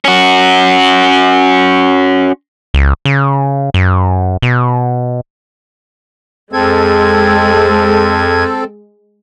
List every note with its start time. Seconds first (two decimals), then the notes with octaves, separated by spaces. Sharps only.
0.05 C#4 F#4
2.74 C#2
3.05 C#3
3.74 F#2
4.42 B2
6.53 F2 G#3 C4 A4 G#6